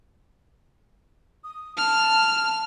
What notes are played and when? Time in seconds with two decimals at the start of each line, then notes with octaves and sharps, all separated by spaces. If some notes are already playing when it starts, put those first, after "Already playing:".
1.44 D#6
1.77 A5 F6